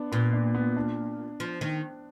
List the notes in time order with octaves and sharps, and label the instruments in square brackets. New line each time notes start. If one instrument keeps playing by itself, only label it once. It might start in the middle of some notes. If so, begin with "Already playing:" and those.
Already playing: [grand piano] B3 D4
[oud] A#2 [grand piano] B3
[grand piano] D4
B3
D4
[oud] F3
D#3